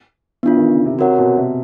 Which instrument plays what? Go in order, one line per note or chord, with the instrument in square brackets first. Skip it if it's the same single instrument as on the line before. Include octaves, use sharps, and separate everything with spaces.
[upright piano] E3 [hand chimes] B3 D4 F4
[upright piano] D#3
C#3
C3
[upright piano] C3 [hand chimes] F#4 A#4 C#5 F#5
[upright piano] B2
C3